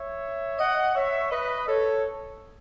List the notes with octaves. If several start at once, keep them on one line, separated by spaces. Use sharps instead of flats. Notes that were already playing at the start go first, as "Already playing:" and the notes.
Already playing: C#5 E5
D#5 F#5
C#5 E5
B4 D#5
A4 C#5